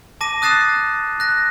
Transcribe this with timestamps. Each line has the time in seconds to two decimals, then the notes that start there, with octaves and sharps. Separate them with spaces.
0.21 A5 D6 A#6 D#7
0.42 D#6 F#6 A6 C7 E7
1.20 F#6 A#6